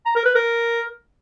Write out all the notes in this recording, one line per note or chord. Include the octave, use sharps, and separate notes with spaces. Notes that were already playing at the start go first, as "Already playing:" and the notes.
A#5
A#4
B4
A#4